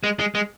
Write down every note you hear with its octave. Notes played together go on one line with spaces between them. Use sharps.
G#3
G#3
G#3